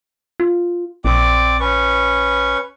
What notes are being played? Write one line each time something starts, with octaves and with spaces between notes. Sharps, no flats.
F4
A#1 C4 D5 D6
C#4 B4 C#6